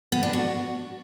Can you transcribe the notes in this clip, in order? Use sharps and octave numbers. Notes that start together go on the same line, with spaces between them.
B3
D4
F#4